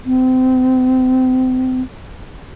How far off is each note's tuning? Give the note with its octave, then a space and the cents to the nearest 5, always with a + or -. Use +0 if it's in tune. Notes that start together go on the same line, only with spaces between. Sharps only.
C4 -30